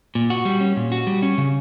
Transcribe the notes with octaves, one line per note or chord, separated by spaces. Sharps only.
A#2
F#4
G3
C#4
A#2
F#4
G3
C#4
C#3